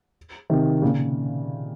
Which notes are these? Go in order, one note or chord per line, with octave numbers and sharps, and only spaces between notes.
C3 D#3
A#2 C#3